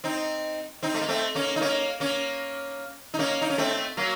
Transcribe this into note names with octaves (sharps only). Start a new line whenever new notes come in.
C4 D#4
C4 D#4
A3
A#3
A3 C4
A#3 C#4
D#4
A#3 C#4
A#3 C#4
D#4
A#3 C#4
D#4
C#4
A3 C4
F#3 A#3